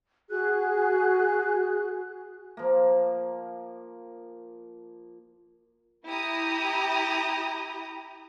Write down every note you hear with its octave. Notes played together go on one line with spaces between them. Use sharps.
F#4 G#4 F#6
F3 A#3
E4 G4 A#5 D#6